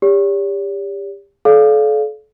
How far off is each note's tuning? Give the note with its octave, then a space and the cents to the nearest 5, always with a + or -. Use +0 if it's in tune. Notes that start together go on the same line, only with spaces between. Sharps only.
G4 +30 C#5 +45
A4 -35 D5 -30 F5 +0